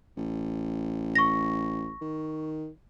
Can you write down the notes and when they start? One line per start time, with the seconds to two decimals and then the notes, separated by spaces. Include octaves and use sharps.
0.17 A1
1.15 C#6 A#6
2.01 D#3